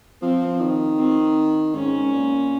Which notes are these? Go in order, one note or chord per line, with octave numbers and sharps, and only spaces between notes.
F3 C4
D#3
C4
G#2 C#4
A#2